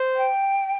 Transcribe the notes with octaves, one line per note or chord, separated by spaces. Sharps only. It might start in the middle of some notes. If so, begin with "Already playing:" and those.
Already playing: C5
G5